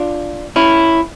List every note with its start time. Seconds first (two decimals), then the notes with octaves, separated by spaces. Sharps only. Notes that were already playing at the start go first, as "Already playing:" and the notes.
Already playing: D4 F4
0.56 C#4 E4